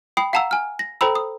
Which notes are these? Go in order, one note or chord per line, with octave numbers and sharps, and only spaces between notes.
G5 B5 D#6 C7
F5 F#5 A5 A#5 E6
G#5 F6
A#6
A4 C5 G5 A#5 B5 E6
D#6